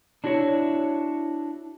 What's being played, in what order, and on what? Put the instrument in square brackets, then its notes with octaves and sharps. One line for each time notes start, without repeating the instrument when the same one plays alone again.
[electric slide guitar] D4 E4 F#4 A4 C#5